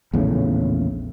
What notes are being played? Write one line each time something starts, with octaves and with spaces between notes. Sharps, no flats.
A#1 E2 A2 C#3